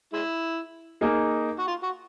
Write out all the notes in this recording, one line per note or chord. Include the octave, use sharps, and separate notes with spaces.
G#3 E4
A#3 D#4 G#4
F#4
F4
F#4